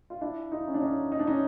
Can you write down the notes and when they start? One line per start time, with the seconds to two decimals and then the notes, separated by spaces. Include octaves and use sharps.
0.10 F4
0.21 D4 E4
0.52 D#4 F4
0.67 C#4
0.74 D4
0.81 C#4 D#4
1.12 D#4
1.19 D4
1.27 C#4 D#4